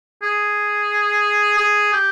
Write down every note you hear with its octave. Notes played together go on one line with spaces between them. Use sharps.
G#4
G#4
G4